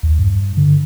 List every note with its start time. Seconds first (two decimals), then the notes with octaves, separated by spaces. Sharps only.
0.03 D#2
0.19 G2
0.57 D3